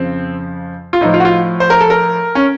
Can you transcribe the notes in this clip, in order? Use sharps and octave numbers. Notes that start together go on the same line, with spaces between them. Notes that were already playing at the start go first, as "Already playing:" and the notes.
Already playing: F2 C#3 F3 C4
F4
A2 F3 D#4
F4
F#4
F4
C5
A#4
A4
A#4
C#4